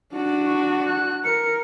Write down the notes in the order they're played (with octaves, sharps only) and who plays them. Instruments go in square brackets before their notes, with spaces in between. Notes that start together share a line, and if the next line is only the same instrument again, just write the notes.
[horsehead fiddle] D4 F#4
[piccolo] C#6
F#6
[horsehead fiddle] A#4 [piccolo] C#7